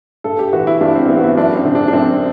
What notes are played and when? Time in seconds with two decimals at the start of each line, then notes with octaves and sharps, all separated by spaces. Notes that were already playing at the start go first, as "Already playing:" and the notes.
0.24 G2 A4
0.39 G4
0.53 E3 F#4
0.67 E4
0.81 G2 D4
0.95 C4
1.09 E3 B3
1.18 F#4
1.24 E4
1.37 F#2 D4
1.56 C4
1.65 D3
1.75 D4
1.88 D4
1.93 F#2 C4